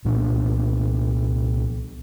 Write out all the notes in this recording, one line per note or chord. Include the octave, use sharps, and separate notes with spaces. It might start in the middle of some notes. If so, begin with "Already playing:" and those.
C2 A#2 F#3 D4